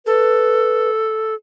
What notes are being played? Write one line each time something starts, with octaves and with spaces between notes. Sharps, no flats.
A4 B4